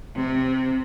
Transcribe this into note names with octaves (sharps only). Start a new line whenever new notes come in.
C3